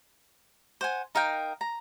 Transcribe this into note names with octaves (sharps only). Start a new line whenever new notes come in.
C5 F#5 G#5
D#4 A#4 F5 G5
A#5